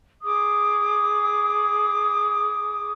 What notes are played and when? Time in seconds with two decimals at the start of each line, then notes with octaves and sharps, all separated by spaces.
0.23 G#4 D6 D#6